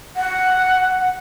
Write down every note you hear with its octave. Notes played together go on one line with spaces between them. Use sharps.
F#5